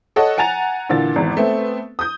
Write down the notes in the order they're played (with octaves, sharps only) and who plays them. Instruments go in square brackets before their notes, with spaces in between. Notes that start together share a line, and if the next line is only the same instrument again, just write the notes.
[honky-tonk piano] A4 C#5 D#5 F#5
F#5 G#5 A#5 A6 F7
A#2 D3 E3 A6
G#1 E2
A3 B3 C4
D#6 G6